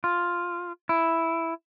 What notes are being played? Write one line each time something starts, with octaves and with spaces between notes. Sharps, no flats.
F4
E4